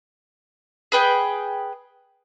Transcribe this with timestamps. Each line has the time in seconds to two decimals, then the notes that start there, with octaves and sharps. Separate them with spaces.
0.92 G#4 B4 G5 D#6